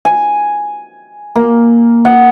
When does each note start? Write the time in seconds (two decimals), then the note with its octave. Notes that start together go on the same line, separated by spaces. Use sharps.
0.05 G#5
1.36 A#3
2.05 F#5